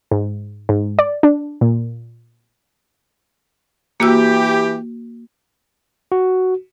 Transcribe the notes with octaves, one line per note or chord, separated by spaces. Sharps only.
G#2
G#2
D5
D4
A#2
E3 A#3 F#4 G4 E6
F#4